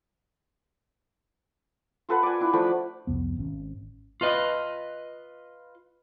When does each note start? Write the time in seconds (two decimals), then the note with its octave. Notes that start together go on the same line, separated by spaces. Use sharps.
2.09 F4 A4 B4 F#5
2.23 D5 G#5
2.40 D4 E4
2.53 F3 A3 D4 B5
3.07 C2 F2 B3
3.36 G#1 C#4
4.21 F4 B4 D#5